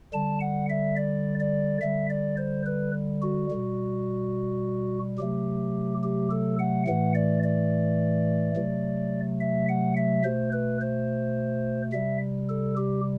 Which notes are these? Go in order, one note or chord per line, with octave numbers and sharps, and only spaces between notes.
D3 G3 A5
F#5
E5
D5
D5
D3 G3 E5
D5
C5
B4
F#4
B2 G3
C3 F#3 A3 G4
G4
A4
F#5
A2 E3 A3 F#5
D5
D5
C3 F#3 A3
E5
F#5
E5
B2 A3 C5
B4
C5
C3 G3 E5
A4
G4